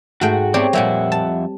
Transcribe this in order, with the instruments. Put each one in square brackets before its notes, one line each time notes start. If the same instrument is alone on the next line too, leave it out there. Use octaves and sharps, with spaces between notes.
[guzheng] G#2 A3 G5 [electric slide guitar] F#4
[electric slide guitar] A3 B3 D5 [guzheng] C4 G4 C#5
[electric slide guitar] F2 E5 F#5 [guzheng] A#2 G3 A#3
[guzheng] A5